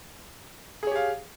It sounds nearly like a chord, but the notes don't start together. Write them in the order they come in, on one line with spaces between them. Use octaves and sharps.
G#4 C#5 G4 F5